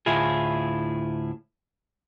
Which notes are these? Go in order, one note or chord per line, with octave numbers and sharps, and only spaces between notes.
D2 A2 E4 F4 G#4